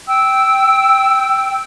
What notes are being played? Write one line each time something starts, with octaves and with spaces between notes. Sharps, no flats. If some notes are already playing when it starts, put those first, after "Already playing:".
G5 E6